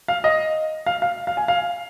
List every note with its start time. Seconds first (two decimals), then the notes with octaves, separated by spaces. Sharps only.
0.08 F5
0.24 D#5
0.86 F5
1.02 F5
1.27 F5
1.37 G#5
1.48 F5